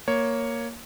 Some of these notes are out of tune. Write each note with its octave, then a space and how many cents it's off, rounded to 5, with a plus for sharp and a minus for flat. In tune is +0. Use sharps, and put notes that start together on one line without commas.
A#3 +0 C#5 +0